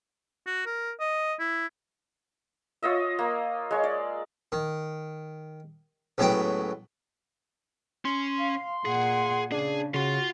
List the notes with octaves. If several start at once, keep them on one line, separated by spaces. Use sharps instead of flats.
F#4
A#4
D#5
E4
F4 C#5 D#5 E5
A#3
G#3 C#5
D5
D#3
C#2 A2 F#3 B3 F#4 G5
C#4 C6
F5
A#2 G#4 F#5
C#3 D4 G#4
C#3 F4 F#4 C6